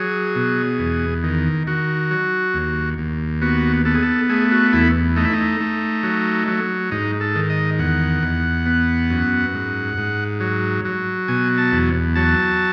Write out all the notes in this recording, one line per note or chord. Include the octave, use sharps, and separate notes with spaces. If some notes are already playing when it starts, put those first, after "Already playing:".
Already playing: F#3 G#4
B2
E2
D#3
D#3 F#4
F#3
D#2
D#2
B3 F#4
B3 A4
G#4
A4
A3 G#4
F#4
E2 E4
A3 D#4
E4
D#4
A3
F#3
F#3
G#2 D#4
A4
D#3
D#5
E2 F#5
E2
B3
F#2
G#2
G#2
F#3
F#3
B2 G#5
A5
E2
F#3 A5